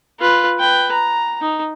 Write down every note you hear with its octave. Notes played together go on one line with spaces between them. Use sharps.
F4 B4
B4 G5
A#5
D#4